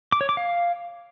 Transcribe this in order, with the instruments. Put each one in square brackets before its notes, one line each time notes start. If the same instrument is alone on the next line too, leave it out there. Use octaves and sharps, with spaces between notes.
[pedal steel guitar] D6
C#5
D6
F5